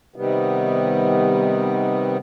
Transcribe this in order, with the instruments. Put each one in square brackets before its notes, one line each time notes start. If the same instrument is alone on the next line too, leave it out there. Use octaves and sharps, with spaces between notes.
[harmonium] C3 D#3 G3 B3